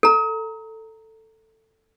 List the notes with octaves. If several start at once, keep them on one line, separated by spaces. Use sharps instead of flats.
A4 A#5